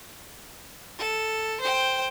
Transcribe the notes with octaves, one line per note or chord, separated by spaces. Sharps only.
A4
C5 G5